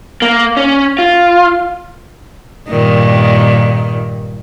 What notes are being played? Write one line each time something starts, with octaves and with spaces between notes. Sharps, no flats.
A#3
C#4
F4
G2 A#2 D#3